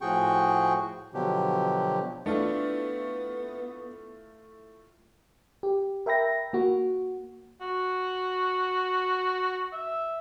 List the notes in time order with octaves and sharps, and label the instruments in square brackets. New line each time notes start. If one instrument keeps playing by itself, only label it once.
[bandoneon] A2 F3 F#4 G#4 G5 C#6
B2 D3 F3 F#3 G4
[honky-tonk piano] A3 E4 F4 [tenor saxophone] B3 [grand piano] D4
[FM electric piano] G4
A#4 E5 G5 B5 A#6
A#3 F#4
[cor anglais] F#4
E5